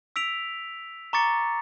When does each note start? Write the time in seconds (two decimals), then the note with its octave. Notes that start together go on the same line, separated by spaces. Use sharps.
0.16 E6 B6 D7 F7
1.13 A#5 C#6 D6 A6 C#7